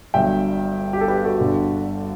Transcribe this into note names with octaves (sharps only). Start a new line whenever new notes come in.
G1 G2 F#3 E5 G5
G4
A4
G4 B4
F#4 A4
G1 G2 D3